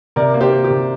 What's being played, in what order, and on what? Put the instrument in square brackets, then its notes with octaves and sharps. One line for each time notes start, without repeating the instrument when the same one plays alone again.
[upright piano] C3 A#4 D5
A#3
G4 C5
A#3
G4
C3